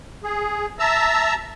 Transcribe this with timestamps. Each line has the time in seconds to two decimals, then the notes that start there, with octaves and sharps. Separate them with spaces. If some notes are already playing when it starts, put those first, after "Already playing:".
0.24 G#4
0.79 E5 A5 A#5 E6